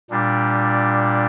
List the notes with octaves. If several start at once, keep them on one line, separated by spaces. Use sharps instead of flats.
A#2 G3 D4